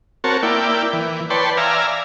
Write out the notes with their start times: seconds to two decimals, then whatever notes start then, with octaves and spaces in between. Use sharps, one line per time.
0.24 C4 F#4 A#4 C#5 A5
0.43 A#3 E4 D5 G5
0.93 E3
1.30 B4 C#5 D5 G5 A5 C6
1.57 D5 E5 F5 G#5 A#5